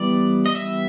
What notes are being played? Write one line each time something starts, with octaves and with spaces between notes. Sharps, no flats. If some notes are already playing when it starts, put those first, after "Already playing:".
Already playing: E3 G3 B3 D5
D#5
E5